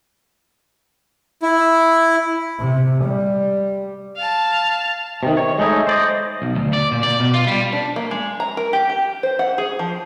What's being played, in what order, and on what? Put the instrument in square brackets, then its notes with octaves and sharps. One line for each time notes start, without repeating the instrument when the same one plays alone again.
[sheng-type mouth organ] E4
[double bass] C3
G3
[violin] F5 A5
[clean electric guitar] C3 D#3
C#5
G#3 A3 D#4 E4
C5 D5 D#5
B1
D2
D5
A#2
D5
B2
F4
G3
[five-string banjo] D4
A#3
G#3
A#5
A#4
G4
G4
C5
F#5
G#4
F3